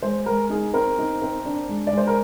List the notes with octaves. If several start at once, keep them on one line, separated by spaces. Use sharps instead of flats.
G#3 C5
G#3 A#4
D#4 G#4
C4 A#4
D#4
C4
D4
G#3
D5
G#3 C5
A#4